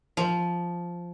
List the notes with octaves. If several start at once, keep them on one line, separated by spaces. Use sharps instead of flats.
F3